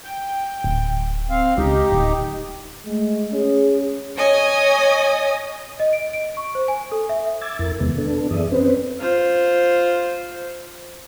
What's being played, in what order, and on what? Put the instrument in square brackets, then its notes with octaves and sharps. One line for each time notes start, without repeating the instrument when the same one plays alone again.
[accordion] G5
[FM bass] D1
[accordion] C4 F5
[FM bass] C#2 [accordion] D#4 G4
[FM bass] D1
[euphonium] G#3 [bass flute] A3
[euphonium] C#4 [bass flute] G#4
[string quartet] C#5 D#5 G#5 D#6
[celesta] D#5
D7
D7
C#6
C5
G#5
A4
E5
[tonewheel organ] D6 E6 G#6 A6
F2 E4 A#4 A6
E2 C3 D#3 G#3 B3
B3 D4 A4
F#2 E3 G#4 D5 E5 D#6
C4 C#4 B4 C5
[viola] F4 C5